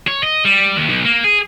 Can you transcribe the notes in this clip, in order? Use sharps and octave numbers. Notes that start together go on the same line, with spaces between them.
C#5
D#5
G3
D#2
B1
A#3
G#4